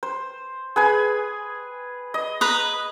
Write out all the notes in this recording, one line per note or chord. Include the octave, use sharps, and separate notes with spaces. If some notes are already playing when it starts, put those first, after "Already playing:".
C5
G#4 B4 G#5
D#5
B4 A#5 D#6